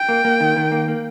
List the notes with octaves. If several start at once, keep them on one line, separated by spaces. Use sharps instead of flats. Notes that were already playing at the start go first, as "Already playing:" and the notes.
Already playing: G5
A#3
A#3
D#3
D#3
A#3
A#3